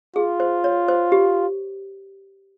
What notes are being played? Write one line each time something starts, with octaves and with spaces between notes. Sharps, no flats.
F4 G#4
C5
C#5
C5
G4